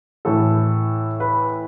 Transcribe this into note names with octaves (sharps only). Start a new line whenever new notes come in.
A2 E3 A4
B4